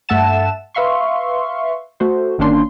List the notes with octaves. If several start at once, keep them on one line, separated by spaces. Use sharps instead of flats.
G2 A3 E5 F#5 A5 E7
B4 E5 F5 C6 C#6
A3 F#4 C5
G1 D#3 A#3 C#4 D4 C6